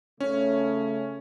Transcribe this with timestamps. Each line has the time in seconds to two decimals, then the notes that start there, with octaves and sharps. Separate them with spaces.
0.20 C#3 A3 C#4